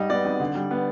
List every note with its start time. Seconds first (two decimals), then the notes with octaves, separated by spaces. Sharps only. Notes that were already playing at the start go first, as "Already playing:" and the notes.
Already playing: G#2 G3 D#5
0.10 B3 D5
0.25 G#1
0.40 D3
0.55 G3
0.71 B3